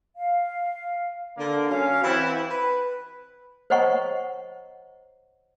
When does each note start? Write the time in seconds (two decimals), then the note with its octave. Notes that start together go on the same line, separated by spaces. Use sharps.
0.17 F5
1.37 D3 A#3
1.70 F#3 C#4 F5
2.02 E3 C4 E4 G4 F#5
2.48 B4
3.70 C5 C#5 D#5 F#5 A#5 C#6